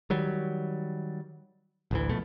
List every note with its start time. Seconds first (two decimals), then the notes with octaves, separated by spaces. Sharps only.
0.10 D#3 F#3 G3
1.91 A1 D2 E3
2.09 A#1 B2 A3